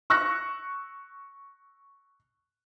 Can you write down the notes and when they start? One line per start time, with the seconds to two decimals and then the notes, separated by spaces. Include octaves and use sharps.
0.10 C#6 E6 F#6 A#6